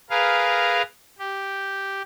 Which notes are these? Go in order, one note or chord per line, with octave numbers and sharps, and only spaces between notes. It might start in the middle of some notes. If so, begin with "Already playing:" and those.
G#4 A#4 B4 F5
G4